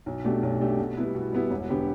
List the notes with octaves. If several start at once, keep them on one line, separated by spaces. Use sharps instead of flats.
B1
B2 A3 D4 G4
B1
B2 A3 D4 G4
B2
G3 B3 E4
B2
G3 B3 E4
E1
D3 B3 G4